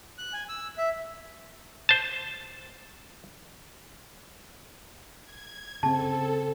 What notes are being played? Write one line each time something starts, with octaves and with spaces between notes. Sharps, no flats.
F#6
G#5
E6
E5
C5 A5
G#6
C#3 C4 A4 A5